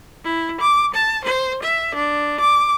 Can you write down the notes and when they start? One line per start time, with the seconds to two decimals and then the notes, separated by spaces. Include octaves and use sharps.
0.24 E4
0.61 D6
0.94 A5
1.24 C5
1.63 E5
1.95 D4
2.40 D6